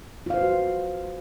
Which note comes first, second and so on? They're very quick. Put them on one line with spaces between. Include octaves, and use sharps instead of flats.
F4 F5 C5 B4 F#4